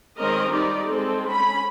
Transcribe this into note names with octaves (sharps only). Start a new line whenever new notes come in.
D#3 G#3 C4 C#4 A#4 D#5
G3 D#4 G4 D5
G#3 C4 A4
C#4 B5